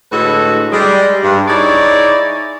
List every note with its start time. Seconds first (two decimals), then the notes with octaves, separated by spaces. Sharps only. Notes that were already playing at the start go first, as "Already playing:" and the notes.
0.11 A2 D3 G#3 F#4 A4 B4
0.72 G3 G#3
1.23 G2
1.47 D#4 E4 G#4 C#5 D5